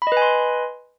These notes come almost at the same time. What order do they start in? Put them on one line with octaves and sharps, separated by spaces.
B5 D#5 B4 G#5 C6